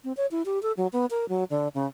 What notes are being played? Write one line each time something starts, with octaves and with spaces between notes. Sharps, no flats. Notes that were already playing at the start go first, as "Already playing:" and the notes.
C4
C#5
E4
G4
A4
F#3
B3
A#4
F#3
D3
C#3